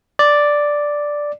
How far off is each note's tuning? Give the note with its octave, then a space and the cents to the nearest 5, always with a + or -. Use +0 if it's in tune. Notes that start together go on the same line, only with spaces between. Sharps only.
D5 +0